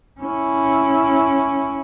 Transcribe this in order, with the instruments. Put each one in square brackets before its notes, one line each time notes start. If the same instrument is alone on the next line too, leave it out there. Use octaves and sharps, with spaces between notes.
[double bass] C#4 E4